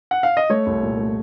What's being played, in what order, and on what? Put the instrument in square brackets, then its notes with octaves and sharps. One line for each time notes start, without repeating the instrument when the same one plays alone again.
[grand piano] F#5
F5
D#5
A3 C#5
C2
A#2
A3